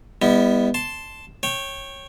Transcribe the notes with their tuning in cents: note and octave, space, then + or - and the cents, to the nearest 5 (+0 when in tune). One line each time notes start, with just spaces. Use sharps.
G3 +35 B3 +0 E4 -30
A5 +0 C6 +0
C#5 -15 G5 +0